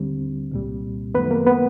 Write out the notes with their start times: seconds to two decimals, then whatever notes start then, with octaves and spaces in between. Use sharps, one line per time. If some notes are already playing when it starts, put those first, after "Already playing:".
Already playing: D#2 D3 G3 C4
0.51 C2 A#2 G3
1.14 F#2 D#3 F#3 A3 B3 B4
1.31 A#3 A#4
1.46 B3 B4